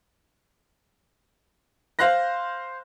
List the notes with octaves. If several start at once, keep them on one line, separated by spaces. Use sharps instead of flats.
C5 F5 C6 F#6 A#6